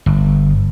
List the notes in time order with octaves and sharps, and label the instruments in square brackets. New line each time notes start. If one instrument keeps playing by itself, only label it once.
[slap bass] G1